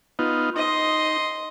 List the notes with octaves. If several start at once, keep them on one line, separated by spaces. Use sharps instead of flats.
B3 D#4 F4
D#4 D#5 C6